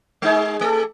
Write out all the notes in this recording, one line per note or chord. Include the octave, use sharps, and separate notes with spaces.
G#3 D#4 G#4
A3 A4